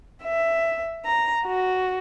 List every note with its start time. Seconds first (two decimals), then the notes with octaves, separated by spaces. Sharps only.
0.23 E5
1.05 A#5
1.46 F#4